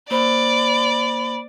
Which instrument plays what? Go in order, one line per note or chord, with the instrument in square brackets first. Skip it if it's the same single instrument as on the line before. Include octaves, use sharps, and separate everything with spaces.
[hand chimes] A#3 C5 [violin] D5 [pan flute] B5